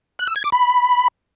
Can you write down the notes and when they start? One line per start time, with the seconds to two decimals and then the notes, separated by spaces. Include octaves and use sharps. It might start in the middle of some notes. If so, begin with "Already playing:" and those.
0.19 F#6
0.27 E6
0.36 G#6
0.44 D6
0.52 B5